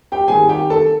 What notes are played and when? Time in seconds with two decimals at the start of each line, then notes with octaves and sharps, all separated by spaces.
0.12 G4 G5
0.27 C2 C3 D#3 G#4 G#5
0.49 G4 G5
0.70 A4 A5